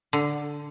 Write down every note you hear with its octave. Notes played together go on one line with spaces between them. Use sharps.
D3